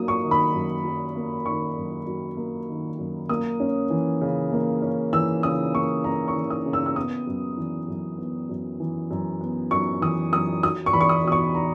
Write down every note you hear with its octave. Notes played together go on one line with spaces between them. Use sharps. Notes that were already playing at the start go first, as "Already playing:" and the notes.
Already playing: F#3 A#3 D#6
C#6
D#3
B5
F#2
F#3
A#3
D#3 C#6
F#2
F#3
A#3
D#3
F#2
A#3 D#6
C#4
E3
C#3
A#3
C#4
E3 E6
C#3 D#6
A#3 C#6
C#4 A#5
C#6
E3
D#6
C#3
E6
E6
B3 D#6
F#2
E3
F#2
B3
F#2
E3
F#2
B3
F#2 C#6
E3 D#6
F#2 D#6
F#3 D#6
C#6
E2 B5
C#6
D#6
B2 D#6
C#6
A#5